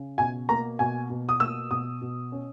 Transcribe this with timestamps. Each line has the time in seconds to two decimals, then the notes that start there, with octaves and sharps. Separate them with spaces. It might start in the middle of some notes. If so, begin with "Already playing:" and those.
Already playing: C#3
0.18 B2 G#5
0.49 A#3 A#5
0.79 B2 G#5
1.10 B2
1.29 D#6
1.40 A#3 E6
1.70 B2 D#6
2.01 B2
2.32 C#4